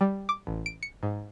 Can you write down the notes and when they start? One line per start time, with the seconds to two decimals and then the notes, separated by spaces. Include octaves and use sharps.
0.01 G3
0.29 D6
0.47 A1
0.66 D7
0.83 C#7
1.03 G#2